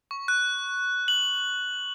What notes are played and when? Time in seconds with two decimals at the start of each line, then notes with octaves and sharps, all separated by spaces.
0.11 C#6
0.28 F#6
1.08 F#7